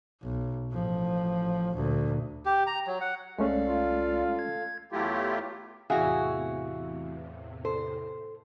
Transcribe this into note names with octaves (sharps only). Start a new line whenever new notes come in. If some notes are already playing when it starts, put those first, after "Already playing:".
B1
A1 F3
D2 A#2
G4
A#5
F#3
F#5
C2 G#3 A3 C#4 A4 D5 F5
F4
G#6
E2 F#3 A3 E4 F4 G4
E2 A2 C3 E3 F#4 G#4 E5 F5
A4 C5